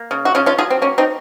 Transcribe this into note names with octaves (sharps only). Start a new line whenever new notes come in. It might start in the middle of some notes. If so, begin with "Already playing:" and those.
Already playing: A#3
C#3
F#4
C#3 C#4 F4
C#4 F4
F#3 F4 G#4
C4
A#3 C#4
C4 D#4